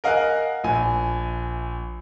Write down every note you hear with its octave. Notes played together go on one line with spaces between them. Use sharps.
A#4 D#5 F5 F#5 G#5 F#6
A#1 G#5